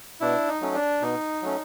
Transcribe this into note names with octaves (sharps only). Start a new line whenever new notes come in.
B2 D4 E4
D#4
F#3 A3 C#4
D4
B2 D#4
F#3 A3 C#4